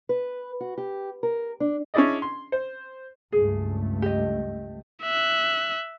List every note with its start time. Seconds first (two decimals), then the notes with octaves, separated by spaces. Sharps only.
0.09 B4
0.60 F#4
0.78 G4
1.23 A#4
1.60 D4
1.94 C#4 D4 E4 G#4 D5 D#5
2.22 C6
2.52 C5
3.32 C#2 G2 A3 G#4
4.02 G4 D#5
5.03 E5 F#6